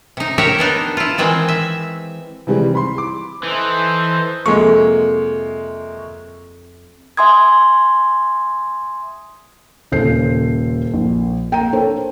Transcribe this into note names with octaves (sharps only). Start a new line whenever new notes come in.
C3 D#4
G4 A#4 C#5 E5 F#5 G5
B3 D4 D#4
E4 F4
D#3 E3 G#3 C4
E5
C3 D#3 E3 G3 G#3 C4
B5 C6
D6
E3 D#4 A4 C5
F2 C3 G#3 A#3 C#6
E5 G#5 C6 D#6 G#6
D#1 C#3 A4 C5 G6 C7
A#1
A#3 G5 A#5 D#7
D4 A4 A#4 C5 C#5